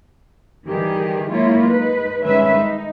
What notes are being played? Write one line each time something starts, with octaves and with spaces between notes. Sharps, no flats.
D#3 E3 G3 G4 G#4
F#3 G#3 A#3 E4 F4 C#5
G#3 D#4 B4
D#3 G3 G#3 C#4 B4 E5
D#4